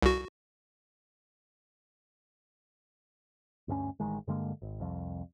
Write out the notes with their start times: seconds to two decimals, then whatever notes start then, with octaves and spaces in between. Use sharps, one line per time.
0.02 C2 F#4
3.68 D2 G2 G3 C#4
4.00 A1 D#3 G#3
4.27 G2 D3 G#3 A#3
4.62 G#1
4.80 C2 F2